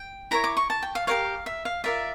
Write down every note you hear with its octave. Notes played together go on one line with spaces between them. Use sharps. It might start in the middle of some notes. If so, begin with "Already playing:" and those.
Already playing: G5
E4 A#4 C#5 A#5
D6
C#6
A5
G5
F5
G4 A#4 C#5 F5
E5
F5
F4 A#4 D5 E5